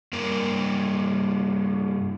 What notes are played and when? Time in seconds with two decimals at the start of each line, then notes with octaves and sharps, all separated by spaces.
0.13 G2 A#3 A#4